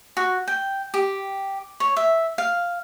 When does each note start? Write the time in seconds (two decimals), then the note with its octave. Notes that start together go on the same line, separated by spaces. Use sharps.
0.17 F#4
0.48 G5
0.94 G4
1.80 C#5
1.97 E5
2.38 F5